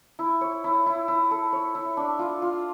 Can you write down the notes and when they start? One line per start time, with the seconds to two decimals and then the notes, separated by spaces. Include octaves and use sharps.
0.19 E4
0.41 C#5
0.64 E4
0.86 E4
1.08 E4
1.31 A4
1.53 C#5
1.75 E4
1.97 D4
2.19 F4
2.42 F4